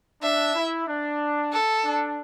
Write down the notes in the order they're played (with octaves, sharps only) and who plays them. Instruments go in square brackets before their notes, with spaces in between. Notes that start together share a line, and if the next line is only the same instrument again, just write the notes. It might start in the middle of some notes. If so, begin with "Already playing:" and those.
[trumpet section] D4 [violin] E5
[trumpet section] E4
D4
[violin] A4
[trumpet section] D4